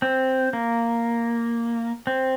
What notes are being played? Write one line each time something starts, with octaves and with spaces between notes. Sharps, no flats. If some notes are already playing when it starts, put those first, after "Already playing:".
C4
A#3
C4